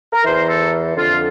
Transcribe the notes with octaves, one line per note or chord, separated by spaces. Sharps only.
A#4
E2 E3 C5
A4
F2 D3 F4